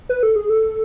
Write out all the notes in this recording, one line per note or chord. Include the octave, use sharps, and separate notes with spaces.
B4
A4
G#4
A4